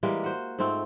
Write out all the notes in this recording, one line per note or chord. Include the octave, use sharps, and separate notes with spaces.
E3 G3 G#3 A#3
F#4 C5
G#2 A3 C4 F4